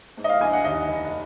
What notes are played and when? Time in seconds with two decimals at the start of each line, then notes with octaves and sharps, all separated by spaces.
0.17 G#2
0.24 D#5
0.29 F5
0.41 A#1 G#5
0.53 F#5
0.64 D#2 D#5
0.89 F1